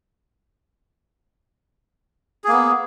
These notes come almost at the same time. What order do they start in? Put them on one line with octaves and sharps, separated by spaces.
G#4 A#3 B3